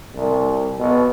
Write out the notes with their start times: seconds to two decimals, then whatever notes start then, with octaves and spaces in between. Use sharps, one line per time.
0.15 C2
0.79 B2